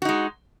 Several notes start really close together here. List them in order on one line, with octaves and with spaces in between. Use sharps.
F#4 D#4 G#3